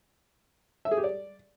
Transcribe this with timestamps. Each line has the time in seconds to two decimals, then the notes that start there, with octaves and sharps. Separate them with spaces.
0.85 E5
0.91 G#4
0.98 G4
1.04 D5